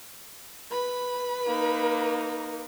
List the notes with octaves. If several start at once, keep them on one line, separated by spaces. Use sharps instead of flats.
B4 B5
A#3 D#4